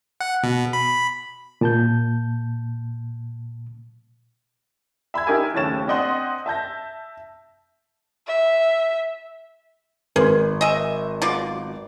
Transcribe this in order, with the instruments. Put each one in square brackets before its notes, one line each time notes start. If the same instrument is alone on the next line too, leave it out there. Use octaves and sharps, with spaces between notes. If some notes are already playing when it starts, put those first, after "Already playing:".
[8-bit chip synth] F#5
B2
B5
[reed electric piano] A#2 A5 G6
[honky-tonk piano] E5 B5 E6 G#6
D#4 G4 A#4 E5 G#5
F#1 D#2 A2 C#4 A6 E7
C4 D4 D#5 F#5 C6
E5 A5 G6 A#6
[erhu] E5
[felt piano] G#1 [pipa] G#4 [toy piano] B4 C6
[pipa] D#5 E5 [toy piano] G#5
[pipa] B2 F4 D5 [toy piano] A5 D6